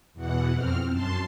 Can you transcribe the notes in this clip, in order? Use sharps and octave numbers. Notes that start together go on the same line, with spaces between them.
E2 B2 E3 F#5
F2 C4 F6
F#2 A5 C6